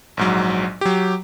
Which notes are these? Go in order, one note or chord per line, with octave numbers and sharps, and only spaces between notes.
A#1 G#2 F#3
F#3 G4